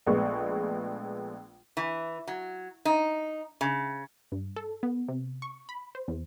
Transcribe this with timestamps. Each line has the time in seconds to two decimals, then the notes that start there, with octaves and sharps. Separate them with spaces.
0.07 A#1 G#3 A3 B3 C#6
1.77 E3
2.27 F#3
2.85 D#4
3.61 C#3
4.32 G2
4.56 A4
4.83 B3
5.08 C3
5.42 C#6
5.69 B5
5.95 C5
6.08 E2